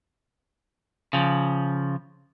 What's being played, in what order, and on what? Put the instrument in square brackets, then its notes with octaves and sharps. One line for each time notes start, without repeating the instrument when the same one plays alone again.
[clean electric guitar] C#3 F3